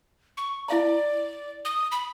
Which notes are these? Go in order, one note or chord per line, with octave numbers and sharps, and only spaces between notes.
C#6
E4 D5 F5 A#5
D#6
B5